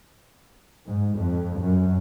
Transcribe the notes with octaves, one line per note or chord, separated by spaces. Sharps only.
G#2
F2
F#2